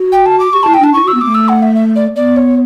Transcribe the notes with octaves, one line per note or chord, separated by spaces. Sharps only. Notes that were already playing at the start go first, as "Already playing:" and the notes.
Already playing: F#4
G5
A5
D6
G4 C#6
E4 A5
G5
D4 A5
E4 C#6
F#4 E6
B3
A3 D6
E6
F#5
E5
E5
D5
B3 D5
C#5